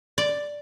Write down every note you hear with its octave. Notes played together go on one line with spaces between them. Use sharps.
D5